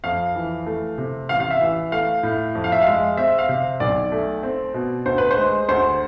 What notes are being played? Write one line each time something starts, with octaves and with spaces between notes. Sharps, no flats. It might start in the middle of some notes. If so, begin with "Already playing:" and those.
F2 F5
E3
A3
C3
A1 F5
F5
E5
E3
A3 F5
A2
F2
F5
E5
G#3 F5
C4 E5
F5
C3
B1 D5
A3
C4
B2
D2 C5
B4
C5
G#3
D2 C5